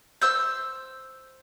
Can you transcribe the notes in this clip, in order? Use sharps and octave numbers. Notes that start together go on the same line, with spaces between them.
C5 E6 G6